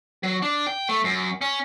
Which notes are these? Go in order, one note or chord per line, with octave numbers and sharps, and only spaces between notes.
F#3
D4
G5
A3
F#2
C#4